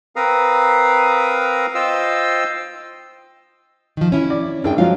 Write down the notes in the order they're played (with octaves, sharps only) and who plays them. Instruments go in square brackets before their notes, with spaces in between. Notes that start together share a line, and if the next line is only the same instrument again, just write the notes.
[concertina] C4 A#4 B4 F5 A#5 D#6
F4 C5 D#5 F5 G5 E6
[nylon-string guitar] D#3 F3
C#4 E4
[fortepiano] D5
[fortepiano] G#1 [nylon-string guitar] D4 G#4 G5
[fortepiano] F3 F#3 F4 [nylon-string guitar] F5